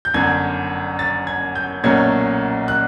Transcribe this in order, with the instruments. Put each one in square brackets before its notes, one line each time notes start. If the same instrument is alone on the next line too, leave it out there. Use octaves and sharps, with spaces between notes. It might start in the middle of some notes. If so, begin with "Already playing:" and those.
[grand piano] G6
G1 F#2 D3 G#6
A6
G#6
G6
B1 A#2 F#3 A3 C#4 G#6
F#6